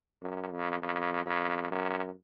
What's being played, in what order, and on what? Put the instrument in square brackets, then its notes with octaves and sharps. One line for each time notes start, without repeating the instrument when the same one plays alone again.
[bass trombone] F#2
F2
F2
F2
F#2